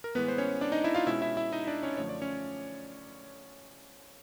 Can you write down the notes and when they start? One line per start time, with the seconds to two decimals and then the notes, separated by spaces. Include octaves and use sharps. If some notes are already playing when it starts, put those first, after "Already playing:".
0.04 A#4
0.15 A2 E3 G#3 B3 B4
0.28 C5
0.38 C#4 C#5
0.61 D4 D5
0.72 D#4 D#5
0.84 E4 E5
0.95 F4 F5
1.06 B2 G#3 C#4 E4 E5
1.22 E4 E5
1.37 E4 E5
1.53 D#4 D#5
1.67 D4 D5
1.83 C#4 C#5
1.97 F#2 D3 F3 A3 C#5
2.09 D5
2.22 C#4 C#5